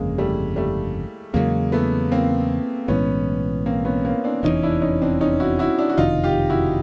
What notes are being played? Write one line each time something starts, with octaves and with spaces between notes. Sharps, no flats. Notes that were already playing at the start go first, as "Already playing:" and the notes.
Already playing: G1 F2 C#3 G#3 A#3
G3 A3
G3 A3
E2 C#3 F#3 G#3 A#3
A3 B3
A#3 C4
B1 A2 E3 G#3 B3 C#4
A#3 C4
B3 C#4
A#3 C4
C4 D4
F1 E2 C3 E3 C#4 D#4
D4 E4
C#4 D#4
C4 D4
C#4 D#4
E4 F#4
E4 F#4
D4 E4
F#4
F#1 F2 C3 D#3 D#4 F4
F4 G4
E4 F#4